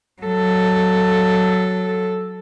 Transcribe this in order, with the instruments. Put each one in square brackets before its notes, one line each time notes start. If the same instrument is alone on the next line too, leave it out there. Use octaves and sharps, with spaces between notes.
[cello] F#3 A4